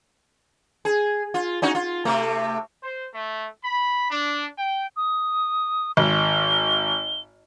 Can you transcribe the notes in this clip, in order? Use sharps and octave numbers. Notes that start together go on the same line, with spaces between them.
G#4
F4
C#4 D#4 F#4
F4
C3 A3
C5
A3
B5
D4
G5
D#6
G#1 G7